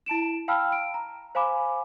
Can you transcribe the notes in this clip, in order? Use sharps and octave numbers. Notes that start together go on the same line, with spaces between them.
E4 A5 D7 E7
F5 G5 A5 B5 E6 F6
D7
A#5
C5 F5 G#5 B5 D6